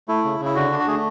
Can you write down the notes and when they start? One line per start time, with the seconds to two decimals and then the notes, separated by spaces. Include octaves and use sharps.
0.08 A3 E4
0.25 C#3
0.40 C#3 E4
0.55 D3 F#4
0.72 D4
0.79 F#4
0.87 A3 G#4